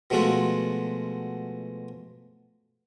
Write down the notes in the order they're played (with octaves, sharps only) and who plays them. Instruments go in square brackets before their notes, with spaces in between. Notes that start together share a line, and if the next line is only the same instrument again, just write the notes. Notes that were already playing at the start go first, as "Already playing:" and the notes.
[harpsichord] B2 F3 G#3 A3 F4 F#4